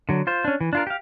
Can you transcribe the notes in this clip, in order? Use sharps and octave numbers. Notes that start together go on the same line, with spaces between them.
D3 F#3
F4 C5
C#4 D4
E3
D4 F4 A#4
G4 F5